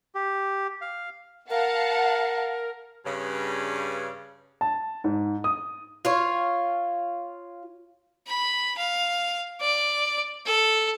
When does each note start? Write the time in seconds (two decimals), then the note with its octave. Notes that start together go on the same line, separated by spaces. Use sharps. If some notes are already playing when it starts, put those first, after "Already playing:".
0.15 G4
0.81 F5
1.50 A#4 F5 F#5 A5
3.06 G2 C#3
4.61 A5
5.04 G#2
5.44 D#6
6.05 F4 C#5
8.27 B5
8.78 F5
9.61 D5
10.46 A4